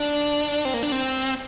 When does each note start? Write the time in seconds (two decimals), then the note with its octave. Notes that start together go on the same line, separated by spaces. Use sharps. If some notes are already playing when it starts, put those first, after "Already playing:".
Already playing: D4
0.65 C4
0.74 A#3
0.83 D4
0.92 C4